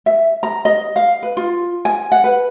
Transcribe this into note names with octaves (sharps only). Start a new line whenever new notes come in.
E5
A#5
D#5
F5
B4
F4
G#5
F#5
B4